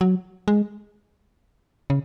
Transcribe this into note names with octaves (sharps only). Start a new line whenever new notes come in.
F#3
G#3
C#3